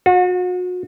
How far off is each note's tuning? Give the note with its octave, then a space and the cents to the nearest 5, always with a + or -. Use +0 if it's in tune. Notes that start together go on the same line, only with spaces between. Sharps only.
F#4 -35